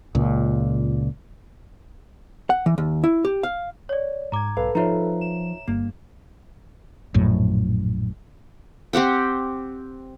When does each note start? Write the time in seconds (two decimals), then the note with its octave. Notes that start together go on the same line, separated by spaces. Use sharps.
0.15 C#2 A#2
2.50 F#5
2.66 E3
2.78 D#2
3.04 E4
3.25 G4
3.43 F5
3.89 C#5 D5
4.32 G#2 A#5 D6 G#6
4.57 B1 A4 B4 F5
4.75 F3 D#4 F4 C#5 E5 A#5
5.21 E7
5.68 G1 G2 A#3
7.14 A#1 F#2 A2
8.93 C4 G4 F#5 G5